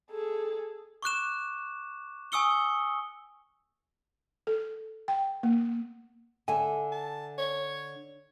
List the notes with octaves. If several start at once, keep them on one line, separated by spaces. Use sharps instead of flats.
G#4 A4
C#6 D6 F#6 E7
G#5 C#6 D#6 E6 C#7 G7
A4
G5
A#3
D3 A4 E5 G#5
A5
C#5